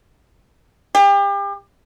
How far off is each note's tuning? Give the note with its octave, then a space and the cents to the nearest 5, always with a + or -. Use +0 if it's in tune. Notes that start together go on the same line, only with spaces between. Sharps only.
G4 +35